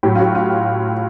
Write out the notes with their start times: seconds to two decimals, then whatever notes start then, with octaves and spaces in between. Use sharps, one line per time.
0.03 A2 F#3 G4
0.15 F4
0.20 F#4
0.35 F4